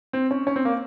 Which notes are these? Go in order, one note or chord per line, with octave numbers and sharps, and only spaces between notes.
C4
C#4
C#4
C4
A#3